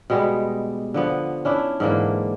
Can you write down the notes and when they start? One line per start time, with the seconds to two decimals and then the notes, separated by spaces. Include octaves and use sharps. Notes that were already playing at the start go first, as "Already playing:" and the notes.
0.10 B2 G3 G#3 B3
0.94 D3 F3 B3
1.45 C#4 D4 E4
1.80 G#2 D3 E3 A#3